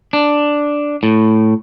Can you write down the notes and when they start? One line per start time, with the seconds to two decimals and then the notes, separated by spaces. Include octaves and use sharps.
0.13 D4
1.03 A2